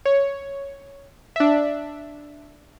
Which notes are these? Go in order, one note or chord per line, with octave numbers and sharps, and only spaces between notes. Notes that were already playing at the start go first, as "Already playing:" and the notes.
C#5
D4 E5